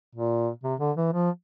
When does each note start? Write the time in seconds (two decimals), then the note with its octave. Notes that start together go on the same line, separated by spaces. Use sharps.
0.15 A#2
0.63 C3
0.80 D3
0.97 E3
1.13 F3